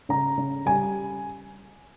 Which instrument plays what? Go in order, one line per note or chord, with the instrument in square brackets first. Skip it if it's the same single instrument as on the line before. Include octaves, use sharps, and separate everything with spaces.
[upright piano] C#3 A#5
C#3
G3 G#5